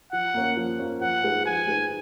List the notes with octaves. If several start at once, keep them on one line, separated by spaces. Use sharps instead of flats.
F3 F#5
A#3 C#4
F3
A#3 C#4
F3 F#5
G#3 D#4 G#4 B4
F3 G#5
G#3 D#4 G#4 B4